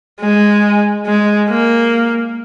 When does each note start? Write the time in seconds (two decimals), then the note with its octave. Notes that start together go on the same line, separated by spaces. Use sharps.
0.20 G#3
1.06 G#3
1.49 A#3